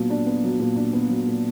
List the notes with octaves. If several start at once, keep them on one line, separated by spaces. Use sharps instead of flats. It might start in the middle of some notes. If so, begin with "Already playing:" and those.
Already playing: A#2 F#3 B3 D4
D4
B3
F#3
A#2
D4
B3
F#3
A#2